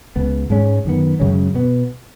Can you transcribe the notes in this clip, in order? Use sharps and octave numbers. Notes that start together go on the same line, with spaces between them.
C#2 C#3 B3
G#2 G#3 C#4
F#2 D#3 B3
F#2 C#3 G#3 C#4
B2 B3